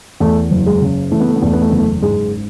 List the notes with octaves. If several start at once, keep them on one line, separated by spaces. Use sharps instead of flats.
E2 A3
F#1
G#3
C#3
E3 A3
B3
A3
B3
E2 A3
B3
A3
F#1 B3
A3
G#2 G#3